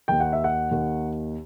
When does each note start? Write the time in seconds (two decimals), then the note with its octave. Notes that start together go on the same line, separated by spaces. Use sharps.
0.08 D#2 D#3 G5
0.20 F#5
0.33 E5
0.44 F#5
0.71 D#2 D#3